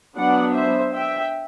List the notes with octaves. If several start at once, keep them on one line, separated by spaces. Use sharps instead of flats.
F#3 B3 D4 D5 F#5
C5 E5
E5 G5